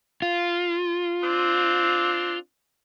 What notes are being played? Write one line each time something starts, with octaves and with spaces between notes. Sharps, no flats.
F4
C4 D4